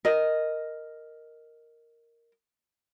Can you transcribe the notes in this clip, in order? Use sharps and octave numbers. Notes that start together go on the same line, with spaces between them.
A#4 D#5